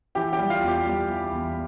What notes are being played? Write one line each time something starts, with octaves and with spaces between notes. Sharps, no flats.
E3 G4 G5
G4 G5
G3
F4 F5
E2
G4 G5
G3
E3
E2